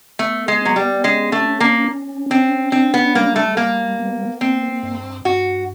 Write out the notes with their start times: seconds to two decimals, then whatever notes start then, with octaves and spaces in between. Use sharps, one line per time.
0.19 A3 B3
0.48 G#3
0.62 F#3 B3
0.76 G3
1.04 G#3 C#4
1.32 A3
1.46 C#4
1.60 A#3
1.88 C#4
2.30 C4 C#4
2.72 C4 D4
2.94 B3
3.15 G3 A#3
3.36 A3
3.57 G3 A#3
3.99 B3
4.41 A#3 C4
4.83 G2
5.25 G2 F#4